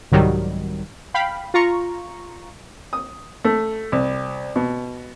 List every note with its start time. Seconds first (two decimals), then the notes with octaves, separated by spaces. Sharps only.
0.12 C2 G#2 D#3 F#3 G3
1.14 F5 G5 B5
1.54 F4 A#5 C#6
2.93 D#6
3.45 A3
3.92 C2
4.56 B2